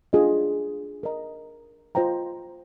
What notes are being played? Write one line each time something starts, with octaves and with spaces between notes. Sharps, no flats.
D4 F4 G#4 D#5
A#4 D#5 A#5
F4 C5 D#5 G5 A#5